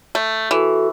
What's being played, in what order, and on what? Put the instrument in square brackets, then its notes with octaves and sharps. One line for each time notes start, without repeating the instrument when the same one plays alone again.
[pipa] A3
[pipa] E3 [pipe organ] F#4 A4